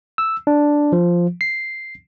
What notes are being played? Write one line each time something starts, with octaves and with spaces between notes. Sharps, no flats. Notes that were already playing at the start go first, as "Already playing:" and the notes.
E6
D4
F3
C7